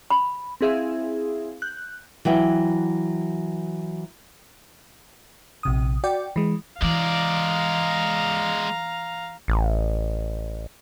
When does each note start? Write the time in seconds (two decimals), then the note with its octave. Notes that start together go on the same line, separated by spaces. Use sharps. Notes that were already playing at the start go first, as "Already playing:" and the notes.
0.11 B5
0.61 C4 E4 G#4 E5 F5
1.62 F#6 G6
2.25 E3 F#3 G5
5.63 A#1 C3 D#6
6.04 F#4 D5 G5
6.36 E3 G#3
6.82 E3 G#3 D5 F5 A#5
9.48 A1